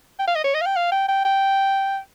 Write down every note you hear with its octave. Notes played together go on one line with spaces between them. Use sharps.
G5
F5
D#5
C#5
D#5
F5
G5
F5
G5
G5
G5